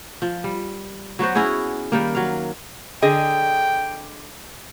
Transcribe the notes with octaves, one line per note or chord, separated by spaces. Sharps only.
F3
G3
F#3 B3 F#4 C5
C#4 E4 F#4 G#4
D#3 G3 A#3
F#3 F5
D3 G#4 D#5 G5